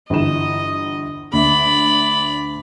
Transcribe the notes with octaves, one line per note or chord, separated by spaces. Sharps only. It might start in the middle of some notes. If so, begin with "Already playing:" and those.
G1 E3 D#5 E7
D2 D5 E5 B5